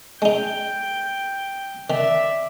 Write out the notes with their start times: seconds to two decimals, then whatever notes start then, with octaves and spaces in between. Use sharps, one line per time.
0.22 G#3 D#4 G5
1.90 D#3 D5 E5